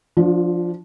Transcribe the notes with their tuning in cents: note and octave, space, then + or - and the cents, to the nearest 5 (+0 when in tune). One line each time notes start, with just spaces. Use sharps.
F3 +0 D4 +0 F4 +45